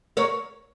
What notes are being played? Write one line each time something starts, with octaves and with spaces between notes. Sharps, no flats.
A#4 C#5